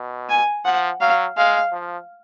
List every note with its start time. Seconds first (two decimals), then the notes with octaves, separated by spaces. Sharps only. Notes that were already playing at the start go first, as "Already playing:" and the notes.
Already playing: B2
0.29 G#5
0.65 F3 F#5
1.00 F#3 F5
1.37 G#3 F5
1.72 F3